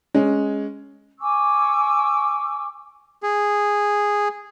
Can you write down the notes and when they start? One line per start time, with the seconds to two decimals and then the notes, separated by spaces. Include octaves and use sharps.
0.14 G#3 C#4
1.20 G#5 C#6 D6 E6
3.23 G#4